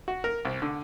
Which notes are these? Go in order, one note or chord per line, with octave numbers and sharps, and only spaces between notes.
F#4
A#4
C2
D3